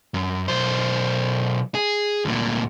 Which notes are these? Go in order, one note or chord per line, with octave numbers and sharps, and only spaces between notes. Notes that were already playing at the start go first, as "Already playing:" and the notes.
F#2
B1 C5
G#4
D2 A#2